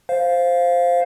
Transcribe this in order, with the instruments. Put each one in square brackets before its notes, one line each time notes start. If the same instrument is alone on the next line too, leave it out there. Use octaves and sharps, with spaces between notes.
[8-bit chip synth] C5 F5